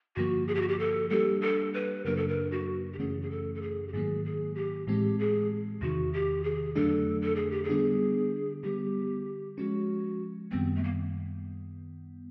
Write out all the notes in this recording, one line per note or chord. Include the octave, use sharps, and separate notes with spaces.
G2 D3 F3 A#3 F#4
G#4
G4
F#4
G4
A4
G3 A#3 D4 G4 A4
A4
B4
F#2 C#3 F#3 A#3 D4 A#4
A4
A#4
F#4
G4
F#2 C#3 E3 A3 C#4 G#4
G#4
A4
A4
G#4
G4
G#2 D#3 F#3 A#3 G#4
G#4
G4
A2 E3 G#3 C4 G4
G#4
E2 C3 D#3 F#4
G4
G#4
F2 D3 F#3 A3 D4 A4
A4
G#4
G4
G#4
D3 G3 B3 D4
D3 G3 B3 G4
F3 G#3 C#4 F#4
F#2 D#3 G3 B3 C4
A3
A#3